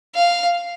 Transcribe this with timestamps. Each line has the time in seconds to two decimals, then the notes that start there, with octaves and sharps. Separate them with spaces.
0.15 F5